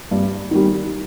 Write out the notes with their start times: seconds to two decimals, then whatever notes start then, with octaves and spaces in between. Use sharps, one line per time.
0.11 G2
0.51 D#3 G3